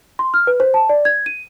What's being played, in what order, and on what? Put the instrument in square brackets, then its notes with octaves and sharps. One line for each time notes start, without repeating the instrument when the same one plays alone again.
[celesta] C6
F6
B4
C5
A5
D5
G#6
D#7